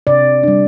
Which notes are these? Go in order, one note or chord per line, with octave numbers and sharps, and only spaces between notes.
C3 D5
G3 D4